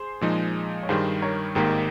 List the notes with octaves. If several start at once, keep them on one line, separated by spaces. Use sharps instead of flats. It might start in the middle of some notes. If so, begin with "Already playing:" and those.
Already playing: G#4 C5
A#2 F3 G#3 D#4
C#5
G2 D#3 G3 G#4 C5
A#4 C#5
G#1 G#2 D#3 A#3 G4 A#4